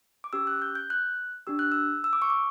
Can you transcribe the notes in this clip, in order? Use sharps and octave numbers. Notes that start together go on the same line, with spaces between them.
D6
C#4 G4 E6
F#6
G6
G6
F#6
D4 G4 E6
F#6
E6
E6
D6
C#6
D6